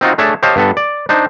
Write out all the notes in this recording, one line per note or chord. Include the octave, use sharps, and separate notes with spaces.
C4 D#4 F4 F#4
A3 D4 G#4 C#5 E5 A5
G4 C5 C#5 D#5 F5 A5
G2 B3 A4
D5
D4 D#4 C5